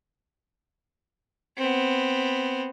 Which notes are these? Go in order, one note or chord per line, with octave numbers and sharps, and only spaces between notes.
B3 C4